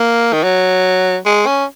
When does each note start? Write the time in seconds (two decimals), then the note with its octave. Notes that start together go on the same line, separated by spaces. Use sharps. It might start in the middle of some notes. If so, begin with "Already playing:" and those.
Already playing: A#3
0.33 D#3
0.44 F#3
1.26 G#3
1.46 C#4